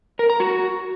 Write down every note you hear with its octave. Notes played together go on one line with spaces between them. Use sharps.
A#4
A#5
F#4